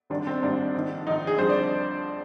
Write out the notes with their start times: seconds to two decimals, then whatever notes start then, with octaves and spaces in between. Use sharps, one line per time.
0.10 G#1 G#2 G3 D4
0.27 C4
0.42 G#1 G#2 G3 D4
0.74 A#1 G#2 D#3
1.06 A#1 G#2 D#3 D#4
1.27 G#4
1.38 F2 D3 G3 C5
1.49 D5